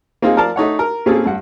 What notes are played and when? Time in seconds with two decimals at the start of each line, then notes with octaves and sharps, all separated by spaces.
0.22 A#3 C4 D#4 F4 G#4
0.37 F3 A#4 D5 F5 A5
0.56 A3 D#4 C#5 F#5
0.79 A#4
1.06 A#2 A#3 C4 C#4 G#4 A4
1.26 G2 F#5